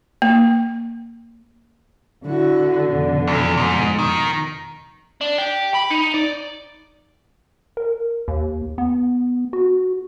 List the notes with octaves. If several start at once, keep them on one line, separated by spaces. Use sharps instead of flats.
A#3
D3 E4 F#4
F2 B2
E2
G#2
D#3
D4
G4
B5
D#4
D5
A#4
D#2
B3
F#4